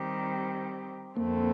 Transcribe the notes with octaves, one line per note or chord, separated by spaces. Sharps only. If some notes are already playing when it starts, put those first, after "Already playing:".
Already playing: D#3 G3 C4 G4
F2 D3 A3 A#3 C4